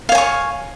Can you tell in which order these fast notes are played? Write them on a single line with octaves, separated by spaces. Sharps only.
F5 C#5 G#5 C#6